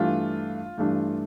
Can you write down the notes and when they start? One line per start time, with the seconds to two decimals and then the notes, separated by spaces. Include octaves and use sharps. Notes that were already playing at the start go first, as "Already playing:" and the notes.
Already playing: G2 E3 A3 D4 F4
0.78 G2 E3 A3 D4